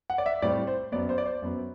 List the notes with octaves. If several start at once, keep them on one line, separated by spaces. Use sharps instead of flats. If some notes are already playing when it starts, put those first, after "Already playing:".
F#5
D5
E5
A2 G3 C4 D5
C5
F#2 F#3 B3 D5
C5
D5
C5
F#2 F#3 B3